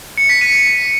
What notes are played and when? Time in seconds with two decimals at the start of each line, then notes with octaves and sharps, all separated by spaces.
0.18 C#7
0.29 B6
0.41 D#7